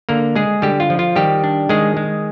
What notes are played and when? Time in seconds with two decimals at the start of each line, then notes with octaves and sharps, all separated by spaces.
0.09 D3 A#3 A#4
0.36 G#3 G#4
0.62 D3 G3 G4
0.80 F4
0.90 F3
0.99 F4
1.16 D#3 G3 G4
1.44 D4
1.69 D#3 G#3 G#4
1.97 G#3